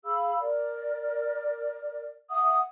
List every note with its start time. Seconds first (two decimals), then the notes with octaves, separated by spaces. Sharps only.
0.05 G#4 F5 B5 E6
0.41 A#4 D5
2.30 E5 F#5 D#6